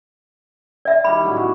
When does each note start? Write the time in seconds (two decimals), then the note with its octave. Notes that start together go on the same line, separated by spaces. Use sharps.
0.85 D5 E5
1.04 D#3 G3 E4 B5
1.23 A2 C#3 F#3
1.36 B3 F#4 G4